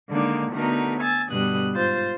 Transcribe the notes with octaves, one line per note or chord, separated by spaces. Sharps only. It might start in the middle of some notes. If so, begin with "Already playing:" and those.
D3 D#3 G#3 A#3 D4 D#4
D3 A3 B3 D#4 F#4 A#4
G#5 E6 A6
G2 B2 D3 G3 D#6 F#6
G#2 F4 C5 G6 A6